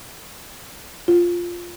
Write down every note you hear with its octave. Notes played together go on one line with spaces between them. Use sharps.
F4